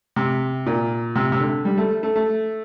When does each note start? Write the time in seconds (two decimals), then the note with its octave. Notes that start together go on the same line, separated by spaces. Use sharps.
0.16 C3
0.66 A#2
1.15 C3
1.32 C3
1.40 D3
1.65 G3
1.77 A3
2.03 A3
2.16 A3